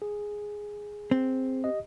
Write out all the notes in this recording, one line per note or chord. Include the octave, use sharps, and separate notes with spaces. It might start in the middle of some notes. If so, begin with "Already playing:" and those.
G#4
C4
G4 D#5